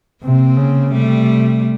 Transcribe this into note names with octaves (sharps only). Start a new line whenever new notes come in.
C3 A#3 C4
C#3
C3 G3 A3